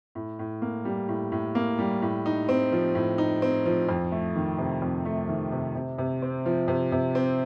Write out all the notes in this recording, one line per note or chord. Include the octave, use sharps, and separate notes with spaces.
A2
A2
A#3
G3
A2
A2
A#3
G3
A2
D#4
C4
F3
A2
D#4
C4
F3
F2
A3
D#3
C3
F2
A3
D#3
C3
C3
C3
C4
F3
C3
C3
C4